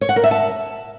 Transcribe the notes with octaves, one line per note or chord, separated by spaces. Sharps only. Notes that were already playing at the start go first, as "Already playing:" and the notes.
C#5
F#5
A#4
E5
A5